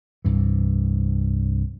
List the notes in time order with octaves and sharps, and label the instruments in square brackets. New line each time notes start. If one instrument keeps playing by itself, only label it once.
[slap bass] C2 G2 E3